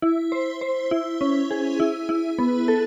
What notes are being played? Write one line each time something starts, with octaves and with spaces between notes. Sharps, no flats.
E4
C5
C5
E4
C#4
G#4
E4
E4
B3
A4